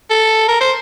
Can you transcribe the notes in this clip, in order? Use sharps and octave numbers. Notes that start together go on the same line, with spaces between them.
A4
A#4
C5